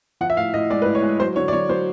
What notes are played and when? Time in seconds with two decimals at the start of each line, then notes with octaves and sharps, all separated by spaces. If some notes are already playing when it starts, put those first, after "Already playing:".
0.21 F3 F#5
0.30 E5
0.37 A2 F5
0.54 A2 D#5
0.70 G#3 D5
0.82 B4
0.86 A2
0.95 C#5
1.03 G#3
1.20 F#3 C5
1.36 D3 C#5
1.48 D5
1.53 F#3 C#5
1.69 F#3 C5